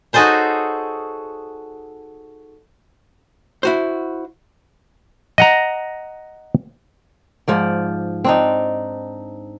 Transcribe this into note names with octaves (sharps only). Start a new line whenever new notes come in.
D#4 F#4 G#4 A4 C5 C#5
E4 F#4 C5
D#5 F#5 A#5
G#2 F3 D5
C4 D4 D#4